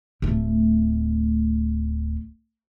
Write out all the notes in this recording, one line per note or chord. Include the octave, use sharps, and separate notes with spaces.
D1 A3